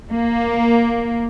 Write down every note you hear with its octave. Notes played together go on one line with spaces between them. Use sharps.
A#3